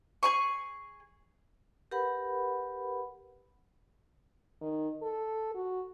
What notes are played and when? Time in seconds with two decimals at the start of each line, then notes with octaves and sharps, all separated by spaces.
0.23 G#4 G#5 C#6
1.91 G4 A#4 B4 F#5 B5
4.61 D#3
5.02 A4
5.55 F#4